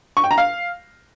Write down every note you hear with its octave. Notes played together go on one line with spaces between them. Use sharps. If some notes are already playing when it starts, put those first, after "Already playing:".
C#6
G5
A#5
F5